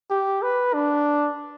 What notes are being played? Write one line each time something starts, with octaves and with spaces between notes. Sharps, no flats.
G4
B4
D4